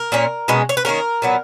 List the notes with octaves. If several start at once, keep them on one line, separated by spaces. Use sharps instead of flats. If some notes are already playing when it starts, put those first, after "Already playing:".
Already playing: A#4
A#2 A#3 C#4
B2 G#3 C#4
C#5
B4
D#3 A#3 C#4 A#4
A#2 F#3 B3